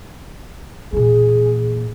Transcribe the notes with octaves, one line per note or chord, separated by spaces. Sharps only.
A#2 E3 G#4